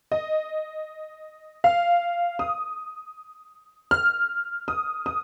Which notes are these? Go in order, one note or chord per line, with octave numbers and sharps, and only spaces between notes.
D#5
F5
D#6
F6
D#6
D#6